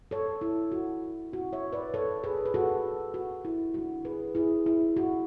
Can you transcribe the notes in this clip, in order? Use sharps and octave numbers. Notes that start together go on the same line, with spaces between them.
A4 C#5
E4
F#4
B2 G#3 C#4 E4 F#4
C#5 E5
B4 D5
A4 C#5
G#4 B4
B4
F#4 A4
F#4
E4
C#3 G#3 D4 F#4
G#4 B4
E4 G#4
E4
F#4